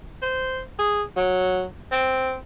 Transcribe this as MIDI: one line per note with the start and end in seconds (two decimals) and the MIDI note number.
0.22 0.61 72
0.79 1.02 68
1.17 1.64 54
1.92 2.36 60